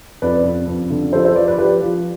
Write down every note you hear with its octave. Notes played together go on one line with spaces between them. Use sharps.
F2 B4 D5
F2
F2
D3
F3 A4 C5
A4 C5
F3 B4 D5
B4 D5
F3 G4 B4
F3